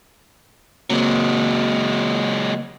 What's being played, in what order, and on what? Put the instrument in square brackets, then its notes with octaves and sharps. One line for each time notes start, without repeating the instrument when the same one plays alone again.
[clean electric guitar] C#2 A#3 C4 [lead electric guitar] F#3 G#3